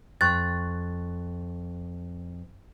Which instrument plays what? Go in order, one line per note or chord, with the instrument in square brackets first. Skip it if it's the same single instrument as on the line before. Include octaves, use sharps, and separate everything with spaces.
[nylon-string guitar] F2 [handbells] C#6 F#6 A6